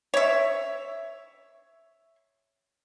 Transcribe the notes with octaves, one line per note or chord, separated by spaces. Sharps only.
C#5 E5